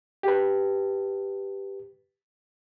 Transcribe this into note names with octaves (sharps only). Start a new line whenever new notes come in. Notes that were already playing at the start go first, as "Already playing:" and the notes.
G4 B4